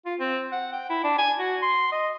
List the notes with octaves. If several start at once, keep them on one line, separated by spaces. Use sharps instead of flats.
F4
C4
F#5
G5
E4
D4
G#5
F#4
C6
D#5